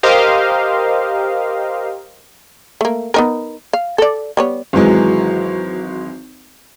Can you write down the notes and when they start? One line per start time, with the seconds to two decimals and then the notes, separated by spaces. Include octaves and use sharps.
0.03 G4 A#4 C5 D#5 F5
2.81 A3 A#3
3.14 B3 D#4 A#4
3.73 F5
3.98 A4 D5
4.37 G3 B3 C#5
4.73 G#1 E3 F#3 G#3